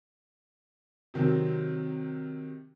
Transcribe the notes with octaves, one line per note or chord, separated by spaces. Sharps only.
C3 D#3 F#3 C4